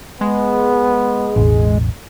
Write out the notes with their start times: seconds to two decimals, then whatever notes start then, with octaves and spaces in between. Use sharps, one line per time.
0.21 G#3 B3
1.36 E1 A1